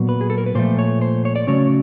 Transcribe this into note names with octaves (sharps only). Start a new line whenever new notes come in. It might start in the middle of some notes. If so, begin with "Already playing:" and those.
Already playing: A#2 F#3 B3
B4
G#4
A4
A#4
B4
A#2 F3 A3 C5
C#5
C5
C#5
D5
C#3 F#3 A3 C#4 C#5